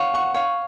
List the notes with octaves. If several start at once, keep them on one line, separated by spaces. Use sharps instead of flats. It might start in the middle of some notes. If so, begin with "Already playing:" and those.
Already playing: C#5 F5 F#5
F#5 C#6
C#5 F5